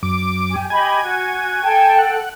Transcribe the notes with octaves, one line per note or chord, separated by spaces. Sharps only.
F#2 D6
G4 G#5
G4 D#5 G#5 B5
F#4
A4 G5 A5
F#5